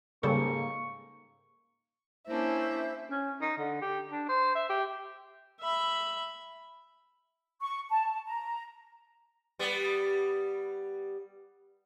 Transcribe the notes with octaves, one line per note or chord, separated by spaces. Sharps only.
G#2 C#3 G3 A#3 A4 C#6
A#3 C#4 D4 E4 C5 E5
C#4
D#4
D3
G4
D4
C5
E5
G4
E5 B5
C#6
A5
A#5
G3 B3